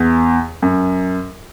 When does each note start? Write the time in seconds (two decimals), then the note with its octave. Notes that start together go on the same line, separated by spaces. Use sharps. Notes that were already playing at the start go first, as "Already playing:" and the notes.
Already playing: E2
0.62 F#2